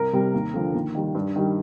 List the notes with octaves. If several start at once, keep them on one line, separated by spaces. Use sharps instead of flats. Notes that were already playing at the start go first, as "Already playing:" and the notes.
Already playing: C2 A#4
C3 G3
D#2
D3 F3
D#2
D#3 G3
G2
D#3 G3